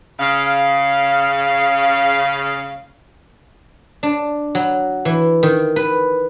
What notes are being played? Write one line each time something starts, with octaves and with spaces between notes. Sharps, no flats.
C#3 F5
D4
F#3
E3
D#3
B4